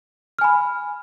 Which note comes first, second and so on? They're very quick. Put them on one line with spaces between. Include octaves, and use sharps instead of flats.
F6 G#5 B5